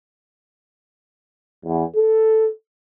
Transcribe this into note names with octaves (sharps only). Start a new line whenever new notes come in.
E2
A4